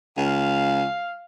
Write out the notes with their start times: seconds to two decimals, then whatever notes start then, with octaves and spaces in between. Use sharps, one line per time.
0.17 C#2 F5